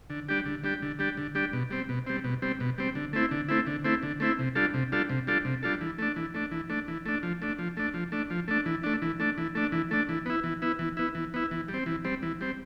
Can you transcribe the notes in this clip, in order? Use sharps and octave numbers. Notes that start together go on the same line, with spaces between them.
D3
G3 D4 G4
D3
G3 D4 G4
D3
G3 D4 G4
D3
G3 D4 G4
B2
G3 C4
B2
G3 C4
B2
G3 C4
B2
G3 C4
D3
A3 C4 E4
D3
A3 C4 E4
D3
A3 C4 E4
D3
A3 C4 E4
C3
G3 D4 F4 A4
C3
G3 D4 F4 A4
C3
G3 D4 F4 A4
C3
G3 D4 F4 A4
E3
A3 D4
E3
A3 D4
E3
A3 D4
E3
A3 D4
F3
A3 D4
F3
A3 D4
F3
A3 D4
F3
A3 D4
E3
A3 D4
E3
A3 D4
E3
A3 D4
E3
A3 D4
E3
B3 E4
E3
B3 E4
E3
B3 E4
E3
B3 E4
E3
G3
C4
E3
G3 C4
E3
G3 C4